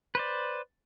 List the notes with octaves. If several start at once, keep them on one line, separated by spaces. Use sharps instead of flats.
B4 C5 D5